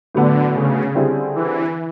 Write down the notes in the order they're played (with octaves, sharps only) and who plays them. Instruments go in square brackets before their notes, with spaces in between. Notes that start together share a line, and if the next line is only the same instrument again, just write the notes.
[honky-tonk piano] A2 F#3 B3 [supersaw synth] D3
[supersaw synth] C#3
[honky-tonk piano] D3 G3 C4 E4 G#4
[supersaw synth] E3